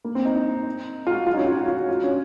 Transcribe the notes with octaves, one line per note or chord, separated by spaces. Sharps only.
A#3
C4
D#4
D#4
F4
F#4
F4
D#4
C#4
F#4
F4
F#4
F4
F4
C#4